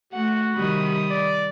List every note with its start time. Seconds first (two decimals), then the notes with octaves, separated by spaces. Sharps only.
0.13 A3 F#4 F#5
0.56 C3 D#3 G3 B5 D#6
1.11 D5